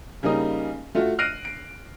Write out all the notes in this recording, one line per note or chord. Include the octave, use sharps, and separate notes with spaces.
C#3 G3 A#3 D#4 D#6
A3 F4 F#4
F6 F#6 A#6 C7 D7 D#7
D7